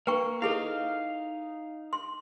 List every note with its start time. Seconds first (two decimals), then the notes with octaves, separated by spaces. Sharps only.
0.07 A#3 B4 G5 C#6
0.42 D#4 E4 G#4 A4 F5
1.93 C6